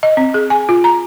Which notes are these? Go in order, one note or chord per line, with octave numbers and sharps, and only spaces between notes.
D#5
C4
G#4
G#5
F4
A#5